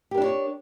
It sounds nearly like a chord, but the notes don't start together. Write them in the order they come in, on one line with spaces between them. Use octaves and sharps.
G4 A#4 D4 E4 C#5